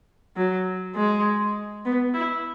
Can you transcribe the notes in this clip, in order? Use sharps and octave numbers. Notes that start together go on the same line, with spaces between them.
F#3
G#3
B3
E4